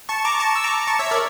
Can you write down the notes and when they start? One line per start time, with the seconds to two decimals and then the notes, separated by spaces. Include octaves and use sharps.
0.09 A5 C#6
0.25 A#5 D6
0.40 A5 C#6
0.56 E6
0.64 A#5 D6
0.87 A5 C#6
0.99 C#5 E5
1.11 A#4 D5